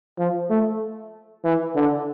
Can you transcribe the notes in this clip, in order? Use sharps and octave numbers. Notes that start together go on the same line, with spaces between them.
F3
A3
E3
D3